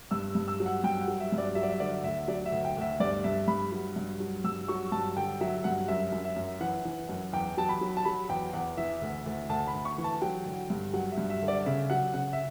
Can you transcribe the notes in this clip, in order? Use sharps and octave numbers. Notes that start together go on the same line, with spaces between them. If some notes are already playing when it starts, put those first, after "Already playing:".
G2 E6
G2
E6
F#3
F#5
G2 G5
F#5
F#3
E5
G2
D5
F#3 E5
D5
E5
D3 D5
D2 E5
F#3 D5
E5
D2
G5
D2 E5
G2 D5
G2 E5
G2 B5
F#3
G2
F#3
G2 E6
F#3 C#6
G2 A5
D3 G5
F#3 E5
G2 F#5
F#2 E5
F#2
E5
F#2
E3 F#5
E3
F#2
E2 G5
F#3 A5
B5
F#3
A5
F#3 B5
E2 G5
E2 F#5
E3 E5
D2
D2
D2 A5
B5
D2
C#6
E3
A5
F#3 G5
D3
G2
F#3 F#5
E5
G2
E5
D3
D5
C#3 E5
F#3 F#5
C#3 F#5
E5